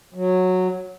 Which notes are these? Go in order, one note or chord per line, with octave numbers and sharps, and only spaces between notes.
F#3